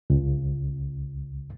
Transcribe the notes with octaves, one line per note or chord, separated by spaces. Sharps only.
C#2